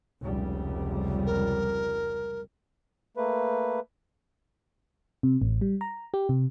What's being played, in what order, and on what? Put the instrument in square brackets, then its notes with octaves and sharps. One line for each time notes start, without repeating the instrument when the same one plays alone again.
[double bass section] F1 C#2 G3
[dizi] A#4
[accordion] A3 A#3 B4
[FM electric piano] C3
A1
G3
A#5
G4
C3